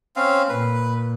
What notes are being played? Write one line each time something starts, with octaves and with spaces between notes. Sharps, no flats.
C4 C#4 F5
A#2 B4